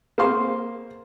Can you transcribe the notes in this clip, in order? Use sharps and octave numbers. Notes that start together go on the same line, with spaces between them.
A#3 G#4 C5 F5 C6